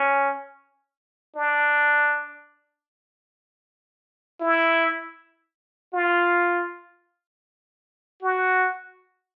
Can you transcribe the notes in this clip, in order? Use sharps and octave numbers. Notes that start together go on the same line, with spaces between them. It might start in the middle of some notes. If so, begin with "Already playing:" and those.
Already playing: C#4
D4
E4
F4
F#4